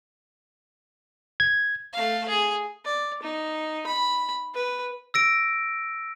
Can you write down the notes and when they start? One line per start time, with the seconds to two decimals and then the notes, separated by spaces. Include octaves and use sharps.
1.40 G#6
1.92 A3 F5
2.28 G#4
2.85 D5
3.22 D#4
3.87 B5
4.54 B4
5.14 E6 A#6 D7